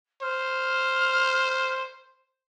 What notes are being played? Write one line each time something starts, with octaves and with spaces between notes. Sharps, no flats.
C5 F6